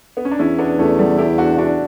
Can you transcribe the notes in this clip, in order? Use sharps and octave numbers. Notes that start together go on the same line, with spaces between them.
B3
C#4
D4
E2 C#4 E4
B3 D4
E2 A3 C#4
G3 B3
E4 G4
D4 F#4
D4 F#4